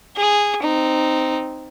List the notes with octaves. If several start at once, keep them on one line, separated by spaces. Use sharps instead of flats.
G#4
C4 D#4